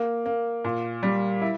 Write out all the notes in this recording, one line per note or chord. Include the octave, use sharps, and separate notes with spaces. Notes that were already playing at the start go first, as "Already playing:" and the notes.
Already playing: A#3
A#3
A#2
G3
E4